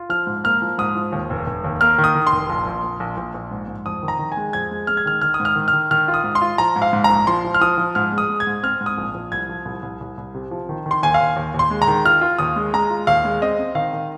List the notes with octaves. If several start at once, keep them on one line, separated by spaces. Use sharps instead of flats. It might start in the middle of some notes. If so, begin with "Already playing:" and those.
Already playing: F4
F3 F6
G#2
A#3 F6
F3
G#2 D#6
F3
D#2
F1
F1
D#2
A#3 F6
D#3
D#6
D#3
C6
F1
A#1
A#1
A#1
A#1
A#1
A#1
G#2
G#2
F2 D#6
D#3
A#5
D#3
G#5
G#3
F2 G#6
G#3
G#3 F6
G#6
D#3 F6
D#3 F6
D#6
G#2
F6
D#3
F6
D#3
D#3 F6
F4
D#6
G#2
C6
F4
F3 A#5
G#2
F5
G#2
A#1 A#5
F3 C6
F3
F6
F3 D#6
F3
G#2 F6
G#3
D#6
G#3
G#6
G#2
C4 F6
G#2
D#6
A#1
A#1
C2 G#6
F3
C2
C2
C2
C2
C3
F3
D#3
D#3
C6
D#2 G#5
F5
D#2
D#2
D#2
C6
G#3
A#5
D#3
F4 F6
F4
D#2 D#6
G#3
G#3 A#5
F4
D#2 F5
G#3
C4 D#5
C4
D#3 F5
D#3